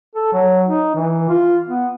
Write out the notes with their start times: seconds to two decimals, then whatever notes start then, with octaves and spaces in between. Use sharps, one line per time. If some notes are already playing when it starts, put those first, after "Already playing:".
0.15 A4
0.33 F#3
0.68 D#4
0.95 E3
1.29 F4
1.68 B3